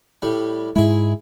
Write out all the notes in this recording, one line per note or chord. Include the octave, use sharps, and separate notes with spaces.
A2 G3
G#2 G#3 E4 G#4